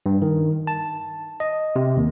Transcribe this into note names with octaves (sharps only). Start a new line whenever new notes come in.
G2
D#3
A5
D#5
C3
D#2